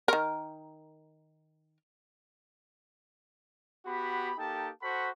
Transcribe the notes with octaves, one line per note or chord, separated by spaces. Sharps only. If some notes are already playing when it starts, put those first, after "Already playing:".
D#3 A#4
B3 F#4 G4 B5
A#3 D#4 G4 A4 G5 A5
F#4 A4 C5 F#5 B5 C#6